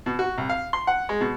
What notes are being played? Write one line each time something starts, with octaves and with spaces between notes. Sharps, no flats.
B2
F#4
C2
F5
C6
F#5
G#3
B2